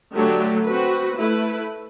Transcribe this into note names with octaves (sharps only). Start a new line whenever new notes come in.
D3 F#3 A3 D4 G4
C4 F#4 B4
A3 E4 B4